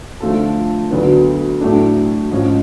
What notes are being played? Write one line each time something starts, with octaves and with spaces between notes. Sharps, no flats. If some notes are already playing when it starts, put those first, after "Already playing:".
D3 F3 A3 F4 A4
D2 D3 F#3 B3
A2 F#3 A3 D4
G#2 F3 G#3 C#4